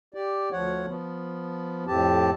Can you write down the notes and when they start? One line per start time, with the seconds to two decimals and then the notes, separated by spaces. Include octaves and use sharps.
0.14 G4 D5
0.52 D2 F3 C#5 F#5
0.87 F3 B3
1.87 F2 A2 C4 G4 A5